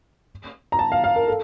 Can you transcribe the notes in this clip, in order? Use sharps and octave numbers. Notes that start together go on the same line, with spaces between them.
A#5
A5
F5
F5
A#4
A4